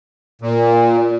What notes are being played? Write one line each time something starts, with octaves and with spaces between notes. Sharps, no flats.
A#2